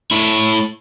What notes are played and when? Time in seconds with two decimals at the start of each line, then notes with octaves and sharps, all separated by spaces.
0.11 A3 E4